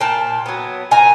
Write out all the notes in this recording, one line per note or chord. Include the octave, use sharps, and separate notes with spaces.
A#2 G5 A5
F#3 B3
A#2 G#5 A#5